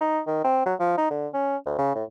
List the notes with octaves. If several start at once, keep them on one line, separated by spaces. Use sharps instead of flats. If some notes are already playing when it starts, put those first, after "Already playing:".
D#4
D#3
C4
F#3
F3
D#4
D3
C#4
D2
C#3
A2